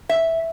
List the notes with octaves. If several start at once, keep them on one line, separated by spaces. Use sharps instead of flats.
E5